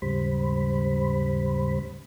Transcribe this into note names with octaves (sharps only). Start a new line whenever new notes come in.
D#2 G#2 C#3 G3 C5 B5